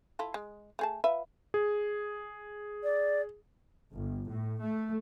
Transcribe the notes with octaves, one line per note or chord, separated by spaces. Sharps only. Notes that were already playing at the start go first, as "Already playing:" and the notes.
E4 F4 A4
G#3
A3 G#4 A5
F4 B4 E5
G#4
D5
G1
A2
A3